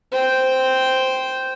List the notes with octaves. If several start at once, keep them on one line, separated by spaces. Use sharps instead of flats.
C5 G5